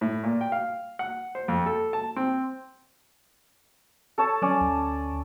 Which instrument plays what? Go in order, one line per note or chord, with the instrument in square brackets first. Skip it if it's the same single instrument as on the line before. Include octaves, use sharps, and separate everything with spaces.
[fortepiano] A2
A#2
G5
F5
F#5
C5
F2
A4
A5
C4
[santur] A4 C#5 A5
[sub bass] F#3 [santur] C#4 D5
[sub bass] D2